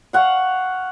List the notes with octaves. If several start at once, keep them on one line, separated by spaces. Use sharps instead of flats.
F5 F#5 C#6